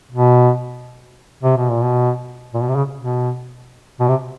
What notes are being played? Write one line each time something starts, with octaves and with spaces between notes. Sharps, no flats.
B2
C3
B2
A#2
B2
A#2
B2
C3
C#3
B2
B2
C3